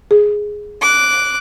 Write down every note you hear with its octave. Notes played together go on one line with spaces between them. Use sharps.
G#4
D6 F#6